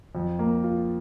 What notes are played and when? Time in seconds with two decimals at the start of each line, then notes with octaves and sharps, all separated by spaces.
0.15 F2
0.39 A#3
0.64 F4